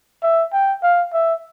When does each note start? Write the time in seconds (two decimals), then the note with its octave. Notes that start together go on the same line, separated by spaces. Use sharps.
0.23 E5
0.53 G5
0.83 F5
1.13 E5